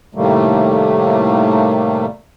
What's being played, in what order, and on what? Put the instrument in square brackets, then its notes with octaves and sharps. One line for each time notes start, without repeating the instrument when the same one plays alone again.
[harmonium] A2 C3 D#3 G3 A3 A#3